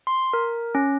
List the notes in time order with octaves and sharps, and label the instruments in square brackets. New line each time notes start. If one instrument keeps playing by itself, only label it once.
[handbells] C6
A#4
C#4